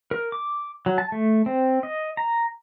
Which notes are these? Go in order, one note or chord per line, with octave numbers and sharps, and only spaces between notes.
A#4
D6
F#3
A5
A3
C4
D#5
A#5